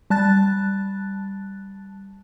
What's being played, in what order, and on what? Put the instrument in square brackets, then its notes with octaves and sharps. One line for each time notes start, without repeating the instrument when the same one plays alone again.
[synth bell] G3 A5 F#6 A6